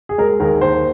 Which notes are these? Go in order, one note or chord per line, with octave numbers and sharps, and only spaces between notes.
G#4
G#3 A#4
D#2 A#4
D#2 C5